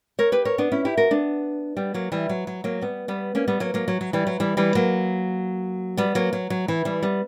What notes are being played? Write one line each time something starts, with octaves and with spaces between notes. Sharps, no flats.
A#4 C#5
G4 B4
A#4 C#5
B3 D4
C#4 E4
E4 G4
F#4 A#4
B3 D4
G3 B3
F#3 A#3
E3 G3
F#3
F#3
F#3 A#3
G3 B3
G3 B3
A#3 C#4
G3 B3
F#3 A#3
F#3 A#3
F#3
F#3
E3 G3
F#3
E3 G3
E3 G3
F#3 A#3
G3 B3
F#3 A#3
F#3
F#3
E3
E3 G3
G3 B3